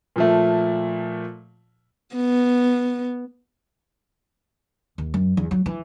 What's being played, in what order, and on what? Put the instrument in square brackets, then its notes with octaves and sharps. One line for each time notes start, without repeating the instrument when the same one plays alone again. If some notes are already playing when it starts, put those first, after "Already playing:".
[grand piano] A#2 F3 A3
[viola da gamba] B3
[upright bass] D#2
F#2
E2
F#3
E3